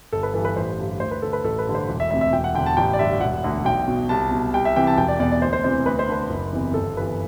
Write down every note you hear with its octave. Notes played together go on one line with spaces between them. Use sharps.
G1 A4
B4
G2 E3 A4
B4
A1 C5
G2 D3
D2 C5
B4
D3 A4
B4
A1 A4
B4
G2 D3
C5
E1
E5
D2 C3 E5
E5
E1 G5
F#5
D3 G5
E2
A5
A1 G5
D5
G2 D3 E5
E1 F#5
D2 D3
B1 G5
B2
C2 A5
B2
C2 G5
E5
C3 E3 G5
A5
E1 G5
D5
E2 B2 D5
D5
D2 C5
C5
C3 E3 C5
D2 B4
C5
D3 B4
F#1
E2 C3 E3
G1 A4
G2 E3 B4